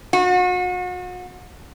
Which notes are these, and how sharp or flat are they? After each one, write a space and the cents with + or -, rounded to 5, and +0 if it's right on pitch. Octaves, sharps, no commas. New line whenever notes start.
F#4 -40